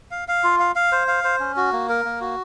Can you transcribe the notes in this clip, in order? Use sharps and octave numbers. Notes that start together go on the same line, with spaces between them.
F5
F5
F4
F5
F5
C5
F5
C5
C#4
F#4
A#3
A#4
A#3
F#4